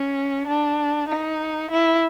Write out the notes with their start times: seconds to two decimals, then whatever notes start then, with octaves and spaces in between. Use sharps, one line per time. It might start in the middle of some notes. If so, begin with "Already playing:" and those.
Already playing: C#4
0.47 D4
1.08 D#4
1.71 E4